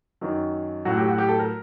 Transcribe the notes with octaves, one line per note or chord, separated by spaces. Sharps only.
F#2 D#3 F#3
A2 F#3 F#4
G4
F#4
G4
A4
A#4